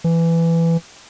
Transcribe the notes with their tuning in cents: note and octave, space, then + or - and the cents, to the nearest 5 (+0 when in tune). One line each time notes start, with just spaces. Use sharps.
E3 +15